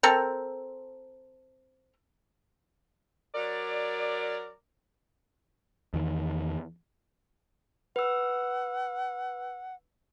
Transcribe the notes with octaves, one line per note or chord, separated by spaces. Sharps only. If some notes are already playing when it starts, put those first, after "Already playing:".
C4 A4 A#4
F#3 A#4 D5
E2 D#3
B4 F#5 E6